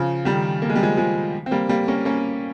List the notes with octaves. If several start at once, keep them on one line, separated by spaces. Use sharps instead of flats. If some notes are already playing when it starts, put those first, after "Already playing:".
Already playing: C#3 F3
D#3 G3
A#3
G#3
G3
F3 G#3
F3 G#3
C4
G3 A#3
G3 A#3
A#3 C#4
A#3 C#4